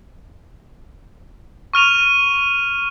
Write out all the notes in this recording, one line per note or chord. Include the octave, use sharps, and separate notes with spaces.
C#6 F6 D#7 F7